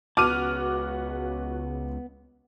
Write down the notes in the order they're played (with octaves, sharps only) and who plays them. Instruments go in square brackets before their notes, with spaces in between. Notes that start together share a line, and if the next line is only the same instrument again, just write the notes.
[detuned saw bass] C#2 [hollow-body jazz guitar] B3 A5 [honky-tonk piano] F#4 [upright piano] D6 F6 D#7